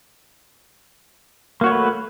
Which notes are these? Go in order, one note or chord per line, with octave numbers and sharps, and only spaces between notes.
A3 A#3 F#4 B4 C#5